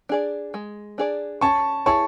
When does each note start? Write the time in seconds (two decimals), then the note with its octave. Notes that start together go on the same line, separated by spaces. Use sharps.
0.09 D4 G#4 D5
0.54 G#3
0.98 D4 G#4 D5
1.41 C#4 A5 C#6
1.86 E4 G#4 C#5 A5 C#6